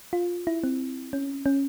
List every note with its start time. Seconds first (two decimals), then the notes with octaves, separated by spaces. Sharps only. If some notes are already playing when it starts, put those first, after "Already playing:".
0.13 F4
0.47 E4
0.64 C4
1.13 C#4
1.46 C#4